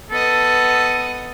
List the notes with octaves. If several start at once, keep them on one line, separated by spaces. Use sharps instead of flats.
B3 A4 D#5